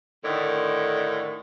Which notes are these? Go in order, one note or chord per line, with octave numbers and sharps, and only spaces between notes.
A2 D3 D#3